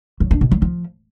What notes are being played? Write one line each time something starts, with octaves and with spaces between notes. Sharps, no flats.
F#3
D4
B2
F#3
F3